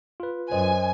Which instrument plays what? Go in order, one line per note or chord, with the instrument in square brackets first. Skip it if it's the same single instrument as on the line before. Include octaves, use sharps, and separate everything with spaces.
[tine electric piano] F4 B4
[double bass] F#2 [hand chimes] C5 D#5 [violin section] G#5